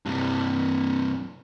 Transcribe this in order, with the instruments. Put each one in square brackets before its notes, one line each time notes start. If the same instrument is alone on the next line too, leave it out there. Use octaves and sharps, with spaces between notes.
[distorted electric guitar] G2 C3